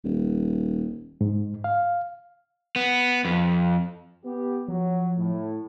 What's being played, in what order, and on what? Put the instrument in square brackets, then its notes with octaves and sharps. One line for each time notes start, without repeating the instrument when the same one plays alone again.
[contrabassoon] D#1
[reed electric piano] G#2
F5
[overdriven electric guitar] B3
F2
[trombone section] B3 G4
[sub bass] F3 [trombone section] F#3
[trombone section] A2